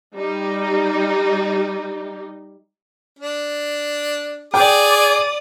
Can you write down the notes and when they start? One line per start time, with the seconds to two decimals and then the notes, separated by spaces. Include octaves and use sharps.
0.16 G3 D#4
3.19 D4
4.54 G#4 D5 G5 D6 D#6